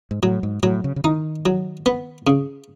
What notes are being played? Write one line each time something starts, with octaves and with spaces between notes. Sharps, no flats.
G#2
A2 F#3
G#2
A2 F#3
C#3
C#3
D#3 D#4
F#3
B3
C#3